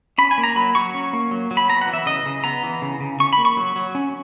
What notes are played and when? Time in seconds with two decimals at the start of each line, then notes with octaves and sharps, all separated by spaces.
0.18 C#4 B5
0.31 G#5
0.38 A#3
0.44 A#5
0.56 F#3 B5
0.75 F#3 C#6
0.94 C#4
1.13 A#3
1.31 F#3
1.51 F#3
1.57 B5
1.69 B3 A#5
1.81 F#5
1.87 E3
1.94 E5
2.06 C#3 D#5
2.26 C#3
2.44 B3 A#5
2.63 E3
2.82 C#3
3.00 C#3
3.20 C#4 C#6
3.33 B5
3.38 A#3
3.45 C#6
3.57 F#3
3.76 F#3
3.95 C#4